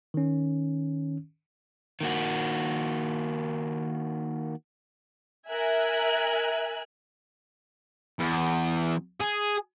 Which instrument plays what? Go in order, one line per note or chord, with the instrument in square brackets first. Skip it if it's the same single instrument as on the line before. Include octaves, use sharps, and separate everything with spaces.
[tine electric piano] D#3 C#4
[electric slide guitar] D#3 A#3 F#4
[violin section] A#4 E5 G#5 F#6
[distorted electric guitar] E2
G#4